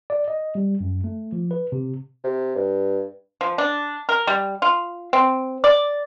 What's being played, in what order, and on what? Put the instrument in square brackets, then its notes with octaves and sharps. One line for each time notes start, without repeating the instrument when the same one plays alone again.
[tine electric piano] D5
D#5
G3
F#2
A3
F3
B4
C3
[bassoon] C3
G2
[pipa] F3
D4
A#4
G3
F4
C4
D5